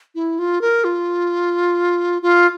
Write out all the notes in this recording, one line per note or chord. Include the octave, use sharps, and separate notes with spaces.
E4
F4
A#4
F4
F4